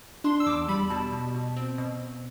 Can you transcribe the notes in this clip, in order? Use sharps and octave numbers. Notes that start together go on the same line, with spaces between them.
D4 C6
E6
E2 D6
G3 B5
B2 A5
B2
B2
C4
B2